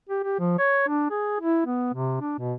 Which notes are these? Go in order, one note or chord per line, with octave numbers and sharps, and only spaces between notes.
G4
G4
F3
C#5
D4
G#4
E4
B3
C3
D4
B2